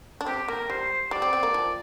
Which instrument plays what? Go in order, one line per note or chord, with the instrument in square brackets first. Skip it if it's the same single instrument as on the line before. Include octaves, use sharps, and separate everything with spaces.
[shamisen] D4
[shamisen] C4 [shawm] G4
[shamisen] A#3 [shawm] A#4
[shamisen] G3 [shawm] C5
[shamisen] G3 [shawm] D5
[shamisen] C4
C4
A#3
F3